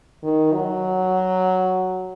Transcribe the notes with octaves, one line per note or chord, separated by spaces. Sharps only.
D#3
F#3